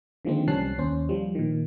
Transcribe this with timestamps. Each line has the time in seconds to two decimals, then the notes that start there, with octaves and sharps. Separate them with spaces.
0.25 D3 D#3 F3 G#3 A#3 C4
0.48 C2 G3 C#4 A5 F#6 C7
0.78 D#2 C#4 C5
1.09 F3 G3
1.35 A#2 D#3